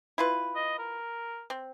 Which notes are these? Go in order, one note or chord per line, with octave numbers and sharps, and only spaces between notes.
E4 F4 B4
D#5
A#4
C4